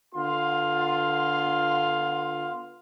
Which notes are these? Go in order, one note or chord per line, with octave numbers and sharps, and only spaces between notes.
D3 B3 F4 F5 C6